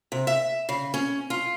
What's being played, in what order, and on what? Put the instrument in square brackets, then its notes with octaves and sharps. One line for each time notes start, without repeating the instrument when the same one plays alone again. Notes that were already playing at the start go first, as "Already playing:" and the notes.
[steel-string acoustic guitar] C3
E5
C#3
C#4
F4